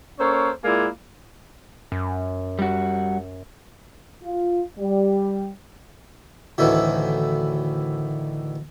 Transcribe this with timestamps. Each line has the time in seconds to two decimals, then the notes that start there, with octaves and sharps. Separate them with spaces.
0.20 A#3 C#4 A4 C5 C#5
0.65 A#2 G#3 A#3 E4 D5 G#5
1.92 F#2
2.59 G3 F#4
4.23 F4
4.78 G3
6.58 D2 A2 D#3 E3